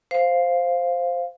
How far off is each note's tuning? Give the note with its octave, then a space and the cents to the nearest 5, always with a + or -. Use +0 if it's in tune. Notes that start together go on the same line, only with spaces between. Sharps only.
C5 +0 F5 +0